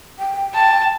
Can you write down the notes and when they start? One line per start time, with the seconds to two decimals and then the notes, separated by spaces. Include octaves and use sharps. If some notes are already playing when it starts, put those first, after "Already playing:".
0.19 G5
0.55 A5